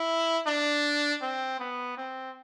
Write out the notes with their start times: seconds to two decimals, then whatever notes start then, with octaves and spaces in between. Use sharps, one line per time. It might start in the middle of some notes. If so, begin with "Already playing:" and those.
Already playing: E4
0.47 D4
1.22 C4
1.60 B3
1.97 C4